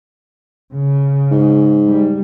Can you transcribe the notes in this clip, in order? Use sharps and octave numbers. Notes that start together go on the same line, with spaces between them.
C#3
G#2
G3